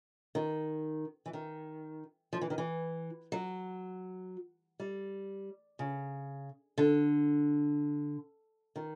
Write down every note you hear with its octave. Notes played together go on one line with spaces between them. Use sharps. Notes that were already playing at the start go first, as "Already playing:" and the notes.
D#3
E3
D#3
F3
E3
D#3
E3
F#3
G3
C#3
D3
D#3